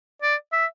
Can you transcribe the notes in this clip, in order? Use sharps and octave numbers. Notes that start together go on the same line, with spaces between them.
D5
E5